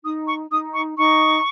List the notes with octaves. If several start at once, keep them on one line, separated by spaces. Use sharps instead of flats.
D#4 D#6
C#6
D#4 D#6
C#6
D#4 C#6